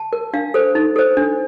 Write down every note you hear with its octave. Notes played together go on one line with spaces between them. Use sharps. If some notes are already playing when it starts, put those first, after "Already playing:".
Already playing: A5
A#4
D4 F5
A4 C5
D#4
A4 C5
D4